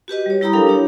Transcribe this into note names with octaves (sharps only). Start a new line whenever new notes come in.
F#4 G4 B4 D#5
G3 C#5
G3 E4 G4 A#5 B5 D#6
F#3 D4 A4 A#4 F5 G5
D4 E4 G4 C#5